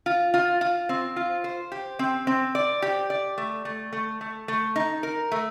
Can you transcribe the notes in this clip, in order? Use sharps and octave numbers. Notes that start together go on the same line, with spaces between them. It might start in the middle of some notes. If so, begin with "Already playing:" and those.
F4
F4
F4
C4
F4
C5
G4
C4
C4
D5
G4
D5
A3
A3
A3
A3
A3
D#4
A#4
A3